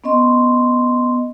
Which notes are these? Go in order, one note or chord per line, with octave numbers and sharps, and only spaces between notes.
B3 C#4 D#5 C6